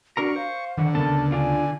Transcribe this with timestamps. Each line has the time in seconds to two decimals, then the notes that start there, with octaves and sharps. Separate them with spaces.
0.17 D4 F#4 A#4 A#5 C#6
0.36 C5 F5
0.77 D3 D#3 F#5
0.95 D2 C#3 B3 A4 A#4 A5
1.32 D4 F4 G#5